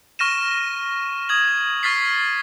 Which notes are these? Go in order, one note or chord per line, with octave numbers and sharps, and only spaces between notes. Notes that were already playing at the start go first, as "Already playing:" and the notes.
C#6 F6 A#6 D#7 E7
D#6 G#6 F#7
C#6 F6 A6 B6 C7